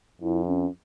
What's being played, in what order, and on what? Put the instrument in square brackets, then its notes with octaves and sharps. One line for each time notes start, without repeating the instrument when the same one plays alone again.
[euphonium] F2 [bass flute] E4
[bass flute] C#4